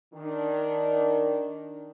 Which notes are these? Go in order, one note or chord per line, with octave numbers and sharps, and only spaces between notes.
D#3 D4